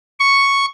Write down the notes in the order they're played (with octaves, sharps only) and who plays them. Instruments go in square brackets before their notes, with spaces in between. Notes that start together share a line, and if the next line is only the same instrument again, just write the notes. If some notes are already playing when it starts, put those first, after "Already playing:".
[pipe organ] C#6